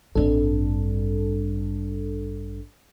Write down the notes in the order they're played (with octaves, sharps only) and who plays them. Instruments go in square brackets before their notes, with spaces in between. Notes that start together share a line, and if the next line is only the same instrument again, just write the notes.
[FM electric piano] A1 D4 A4 [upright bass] G2 C4